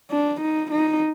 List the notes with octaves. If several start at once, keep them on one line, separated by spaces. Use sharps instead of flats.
D4
D#4
D#4